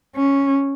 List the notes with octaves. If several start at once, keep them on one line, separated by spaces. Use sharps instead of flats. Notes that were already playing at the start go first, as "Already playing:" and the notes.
C#4